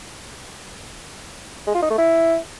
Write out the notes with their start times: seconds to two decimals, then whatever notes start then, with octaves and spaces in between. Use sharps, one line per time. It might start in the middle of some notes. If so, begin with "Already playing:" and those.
1.67 G#3
1.75 F4
1.82 D#4
1.90 A3
1.98 E4